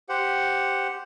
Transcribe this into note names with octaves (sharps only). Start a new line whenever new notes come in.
G4 C5 F#5